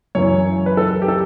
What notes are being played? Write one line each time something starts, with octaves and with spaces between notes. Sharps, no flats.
F#2 C#3 E3 C#5
B4
A4
G4
A4